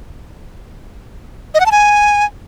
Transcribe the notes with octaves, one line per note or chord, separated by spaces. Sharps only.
D#5
F#5
A5
G#5